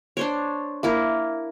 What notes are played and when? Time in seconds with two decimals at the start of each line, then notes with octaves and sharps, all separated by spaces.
0.17 D4 C5 C#5
0.83 A#3 E4 A#4